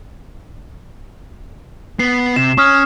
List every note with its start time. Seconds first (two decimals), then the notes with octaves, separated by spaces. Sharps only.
1.99 B3 C7
2.36 C3 E7
2.58 C#4 C#6 D#6 F6